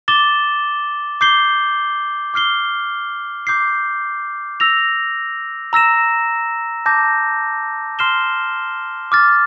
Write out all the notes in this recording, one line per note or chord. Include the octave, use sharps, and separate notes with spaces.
D6 A6 E7 G7
D6 G6 C7 G7
D6 F6 C7 G7
D6 G6 C7
E6 A#6 F7
A#5 E6 A#6 E7
A5 D6 G6 A#6
C6 F6 C7 E7 G7
D6 F6 A6